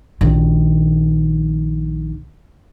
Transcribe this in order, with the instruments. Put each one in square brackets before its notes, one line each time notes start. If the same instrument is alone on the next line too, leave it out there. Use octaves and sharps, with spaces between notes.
[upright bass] A#1 D#3